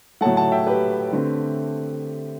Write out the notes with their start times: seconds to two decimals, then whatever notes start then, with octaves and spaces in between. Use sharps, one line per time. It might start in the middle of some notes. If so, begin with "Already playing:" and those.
0.21 A2 F#3 A3 F#5 A5
0.37 F#5 A5
0.52 E5 G5
0.67 G4 B4
1.13 D3 A3 C4